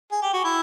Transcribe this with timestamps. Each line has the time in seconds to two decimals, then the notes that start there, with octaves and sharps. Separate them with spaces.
0.11 G#4
0.22 G4
0.33 F#4
0.44 E4